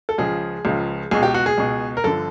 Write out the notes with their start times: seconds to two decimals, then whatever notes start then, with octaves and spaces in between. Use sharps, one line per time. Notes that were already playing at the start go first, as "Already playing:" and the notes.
0.09 A4
0.18 C#2 C#3 F3 G#4
0.65 C#2 C#3 F3
1.11 C#2 B2 G#4
1.23 G4
1.34 F#4
1.46 G#4
1.58 C#2 B2
1.97 A#4
2.04 G1 D3 F3 A4